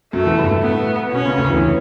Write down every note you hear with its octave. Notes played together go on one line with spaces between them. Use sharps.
F#2 F#3 A3
E2 E3
G2 G3
A2 A3
B3
B2 C#4
C#3
D2 D3
E2 E3